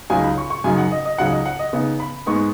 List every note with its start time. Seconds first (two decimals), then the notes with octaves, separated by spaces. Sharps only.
0.10 C#2 C#3 F#3 D#4 G#5
0.24 B5
0.38 C#6
0.50 C#6
0.64 F#2 C#3 F#3 D#4 G#5
0.78 F#5
0.92 D#5
1.05 D#5
1.18 C#2 C#3 F#3 D#4 F#5
1.32 D#5
1.46 F#5
1.59 D#5
1.73 C#3 B3 D#4
2.00 B5
2.26 G#2 G#3 B3 D#4 C#6